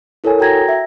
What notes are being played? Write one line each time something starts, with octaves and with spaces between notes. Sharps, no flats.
E4 A4 A#4 C#5 G#5
F#4 G5 A#5 G#6 A#6
E5